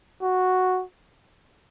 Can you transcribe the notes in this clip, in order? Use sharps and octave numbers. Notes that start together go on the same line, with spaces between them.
F#4